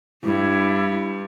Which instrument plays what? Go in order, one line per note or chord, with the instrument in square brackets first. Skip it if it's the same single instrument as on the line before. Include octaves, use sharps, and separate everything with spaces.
[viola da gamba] G2 [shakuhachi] E4